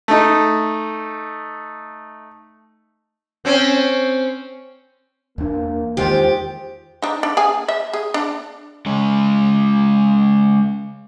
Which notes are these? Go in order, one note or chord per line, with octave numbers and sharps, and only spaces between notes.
A3 D#4
C4 C#4
E2 A#3 D4
E2 D#3 G#3 F4 G4 C5
D4 D#4
D4
G#4 G#5
E5
G#4
D4
G#3 C#4